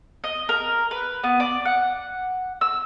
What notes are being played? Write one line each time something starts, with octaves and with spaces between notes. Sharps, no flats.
D#5
A#4
B4
B3
D5
F#5
E6